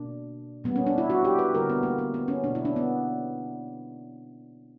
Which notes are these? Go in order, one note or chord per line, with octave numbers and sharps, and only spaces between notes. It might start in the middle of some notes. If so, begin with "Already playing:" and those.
Already playing: B2 A#3 D4
A#2 G3 A#3 B3
C#4
D4
E4
F#4
G4
B4
D3 G3 A#3 A#4
B3
A#3
B3
B3
C#4
B2 A#3 D4
E4
D4
B3